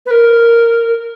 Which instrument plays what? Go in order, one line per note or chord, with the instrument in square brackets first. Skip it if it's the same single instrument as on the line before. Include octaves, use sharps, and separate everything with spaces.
[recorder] B4
A#4